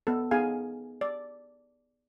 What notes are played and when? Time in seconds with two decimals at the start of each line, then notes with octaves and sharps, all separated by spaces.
0.07 B3 A4
0.31 B3 D#4 G#4 F5 G#5
1.01 D5